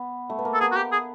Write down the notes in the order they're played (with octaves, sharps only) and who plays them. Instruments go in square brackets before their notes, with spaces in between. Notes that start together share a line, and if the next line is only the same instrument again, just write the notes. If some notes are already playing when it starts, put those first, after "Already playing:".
Already playing: [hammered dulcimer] B3
A3
B3
A#3
[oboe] A4
[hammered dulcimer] B3 [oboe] G#4
[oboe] F#4
G4
G#4